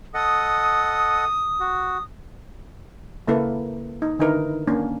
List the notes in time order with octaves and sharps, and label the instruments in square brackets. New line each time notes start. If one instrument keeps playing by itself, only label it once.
[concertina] A4 D#5 F#5 [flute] D#6
[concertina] F#4
[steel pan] C#3 A#3 E4 A4 B4
D#4
D3 D#3 D#4 E4 A#4 B4
A#3 C#4 D4